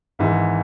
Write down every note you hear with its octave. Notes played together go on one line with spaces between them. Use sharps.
G#1 G#2 E3